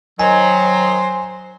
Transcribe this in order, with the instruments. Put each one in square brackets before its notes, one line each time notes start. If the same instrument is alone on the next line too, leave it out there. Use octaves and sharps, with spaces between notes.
[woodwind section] D#3 F#3 [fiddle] C5 [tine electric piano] G#5